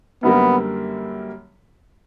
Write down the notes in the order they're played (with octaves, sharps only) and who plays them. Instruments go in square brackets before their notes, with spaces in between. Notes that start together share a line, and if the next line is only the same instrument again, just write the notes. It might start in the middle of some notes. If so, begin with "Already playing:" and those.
[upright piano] F#2 D3 G3 A#3 [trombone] B3